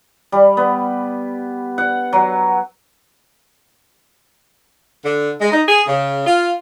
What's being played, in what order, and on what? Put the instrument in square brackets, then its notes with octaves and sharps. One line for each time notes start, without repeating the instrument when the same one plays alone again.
[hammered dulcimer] G3
B3
F#5
F#3
[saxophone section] D3
G#3
D#4
G#4
C#3
F4